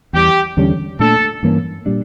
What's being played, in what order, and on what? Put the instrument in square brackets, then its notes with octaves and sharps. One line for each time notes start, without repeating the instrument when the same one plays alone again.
[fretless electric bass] E2 E3 G3 [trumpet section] G4
[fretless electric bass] E2 D3 G3 C#4
[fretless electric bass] A#2 A3 D4 [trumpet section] A4
[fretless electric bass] G2 E3 A#3 C#4
A#2 G3 D4